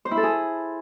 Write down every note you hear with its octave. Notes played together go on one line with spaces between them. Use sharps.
C5
E4
A4
G#4